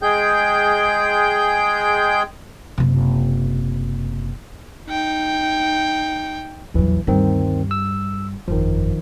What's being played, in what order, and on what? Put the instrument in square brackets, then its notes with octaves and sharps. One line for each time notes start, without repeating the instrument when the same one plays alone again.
[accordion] G#3 G#4 G5 G6
[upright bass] F#1 C3
[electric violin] D#4 G5
[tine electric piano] A#1 E3 [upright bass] E2 F#3
[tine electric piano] D2 D#3 C4 [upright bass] G2 G3
[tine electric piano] E6
[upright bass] G1 F2 [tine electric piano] D#3 F3